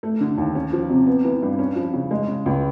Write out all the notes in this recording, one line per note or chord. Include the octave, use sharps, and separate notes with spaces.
A3
D3
D#2
C#4
F3
C3
B3
E3
G2
C#4
F3
C#3
G#3
C#3
C#2